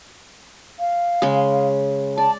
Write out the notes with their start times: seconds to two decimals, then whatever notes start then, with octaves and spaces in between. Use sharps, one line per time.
0.80 F5
1.22 C#3 G#3
2.18 D5 A5